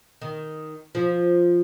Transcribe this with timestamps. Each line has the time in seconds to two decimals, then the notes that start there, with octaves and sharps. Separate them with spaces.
0.22 D#3
0.95 F3